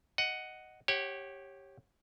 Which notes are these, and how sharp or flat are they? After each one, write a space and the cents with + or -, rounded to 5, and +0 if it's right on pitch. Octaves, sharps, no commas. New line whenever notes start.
D#5 +0 F#5 +5
G4 +0 C#5 -20 F#5 +25